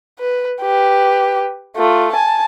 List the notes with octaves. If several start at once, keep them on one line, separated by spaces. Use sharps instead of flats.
B4
G4 B4
A3 F4
G#5 A5